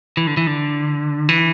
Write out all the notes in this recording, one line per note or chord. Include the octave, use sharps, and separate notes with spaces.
E3
D3
E3
D3
E3